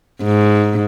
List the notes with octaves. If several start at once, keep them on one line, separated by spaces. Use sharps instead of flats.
G#2